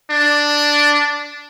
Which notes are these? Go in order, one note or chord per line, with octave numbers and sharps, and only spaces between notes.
D4